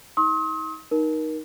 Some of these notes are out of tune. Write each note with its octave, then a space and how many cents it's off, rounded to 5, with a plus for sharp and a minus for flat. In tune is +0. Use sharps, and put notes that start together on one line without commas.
D#4 +35 C6 +40 D#6 +40
D#4 +0 A#4 +25